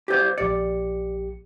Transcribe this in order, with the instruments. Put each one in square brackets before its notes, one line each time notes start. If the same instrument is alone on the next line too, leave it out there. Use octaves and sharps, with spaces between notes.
[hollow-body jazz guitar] G4 C5 D5
[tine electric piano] A#1 G4 C#7 [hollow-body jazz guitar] D5